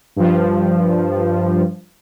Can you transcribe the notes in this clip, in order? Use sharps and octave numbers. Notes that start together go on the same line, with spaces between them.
G2 F3